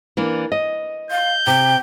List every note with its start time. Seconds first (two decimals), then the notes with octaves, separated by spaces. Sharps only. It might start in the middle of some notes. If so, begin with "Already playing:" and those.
0.17 E3 A#3 D4
0.52 D#5
1.11 F5 G6
1.47 C3 G5